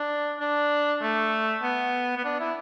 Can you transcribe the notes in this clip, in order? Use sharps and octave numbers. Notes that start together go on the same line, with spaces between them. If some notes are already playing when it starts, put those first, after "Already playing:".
Already playing: D4
D4
A3
B3
B3
D4
E4